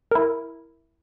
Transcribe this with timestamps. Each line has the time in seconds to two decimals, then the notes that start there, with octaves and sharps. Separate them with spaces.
0.11 E4 A#4